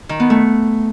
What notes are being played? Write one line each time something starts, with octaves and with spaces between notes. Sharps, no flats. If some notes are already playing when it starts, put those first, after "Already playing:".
D#3
B3
A3